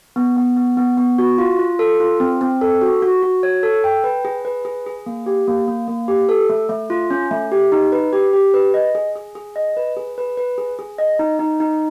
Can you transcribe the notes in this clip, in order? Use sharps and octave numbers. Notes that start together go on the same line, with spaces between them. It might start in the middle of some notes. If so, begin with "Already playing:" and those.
B3
B3
B3
B3
B3
F#4
F4
F4
A4
F4
C4
C4
A4
F#4
F#4
F#4
C#5
A4
G5
B4
G#4
B4
G#4
G#4
A#3
G4
A#3
A#3
A#3
G4
A4
A3
A3
F4
C#4
A3
G4
D#4
B4
G4
G4
B4
D#5
G#4
G#4
G#4
D#5
B4
G#4
B4
B4
G#4
G#4
D#5
D#4
D#4
D#4